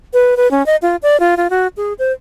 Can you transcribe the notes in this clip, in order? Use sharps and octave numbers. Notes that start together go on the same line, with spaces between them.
B4
B4
C#4
D#5
F4
D5
F4
F4
F#4
G#4
C5